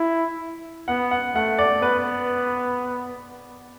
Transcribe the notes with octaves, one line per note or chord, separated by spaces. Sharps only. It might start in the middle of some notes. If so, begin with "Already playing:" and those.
Already playing: E4
B3 F#5
F#5
A3 F#5
D5
B3 B4